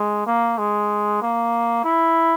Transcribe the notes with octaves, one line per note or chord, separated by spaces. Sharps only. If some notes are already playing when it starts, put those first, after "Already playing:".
Already playing: G#3
A#3
G#3
A#3
E4